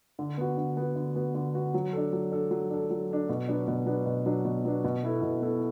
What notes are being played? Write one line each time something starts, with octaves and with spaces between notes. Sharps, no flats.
D3
B3 F#4
D3
B3 F#4
D3
B3 F#4
D3
B3 F#4
F#3
D4 A4
F#3
D4 A4
F#3
D4 A4
F#3
D4 A4
B2
F#3 B3 D4
B2
F#3 B3 D4
B2
F#3 B3 D4
B2
F#3 B3 D4
B2
B3 E4 A4
B2
B3 E4 A4